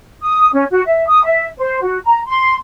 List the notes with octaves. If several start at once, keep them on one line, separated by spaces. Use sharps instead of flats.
D#6
C#4
F#4
E5
D#6
E5
C5
F#4
A#5
C6